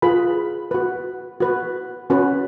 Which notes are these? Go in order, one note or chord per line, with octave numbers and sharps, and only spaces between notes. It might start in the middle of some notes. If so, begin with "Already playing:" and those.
F4 G#4 B4 B5
F#4 B4
F#4 B4
C#4 F#4 B4